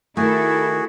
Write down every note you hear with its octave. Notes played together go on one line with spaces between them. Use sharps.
D#3 A3 E4 F#4 G#4 A4